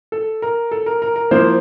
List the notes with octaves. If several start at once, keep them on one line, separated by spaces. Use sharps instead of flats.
A4
A#4
A4
A#4
A#4
A#4
F3 A#3 E4 C5